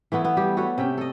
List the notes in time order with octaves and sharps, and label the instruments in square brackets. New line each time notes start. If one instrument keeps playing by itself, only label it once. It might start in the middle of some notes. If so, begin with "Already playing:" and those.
[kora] E3 A3 B3 E4
B3
G3 G4
F#4 A4 B4 C#5
C3 C#4 E5 G5
A4 D#5